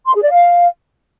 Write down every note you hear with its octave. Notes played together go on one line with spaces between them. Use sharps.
C6
G#4
D5
F5